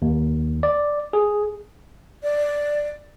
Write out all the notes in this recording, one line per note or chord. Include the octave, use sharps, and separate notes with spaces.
D#2
D5
G#4
D5